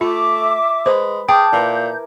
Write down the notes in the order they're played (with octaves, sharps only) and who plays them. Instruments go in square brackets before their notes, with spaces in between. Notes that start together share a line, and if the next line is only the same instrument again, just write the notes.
[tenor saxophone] A3 [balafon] F4 [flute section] E5 D6
[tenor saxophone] G#3 [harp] B4 B5 [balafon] C5
[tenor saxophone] G#4 [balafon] G5 [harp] A5 D6 F6 [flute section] G6
[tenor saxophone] A#2 [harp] E4 A#4 B4